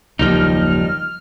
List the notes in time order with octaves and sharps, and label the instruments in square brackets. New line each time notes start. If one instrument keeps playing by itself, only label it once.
[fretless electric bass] F#1 D#2 [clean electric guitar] F3 G3 D#4 [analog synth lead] F6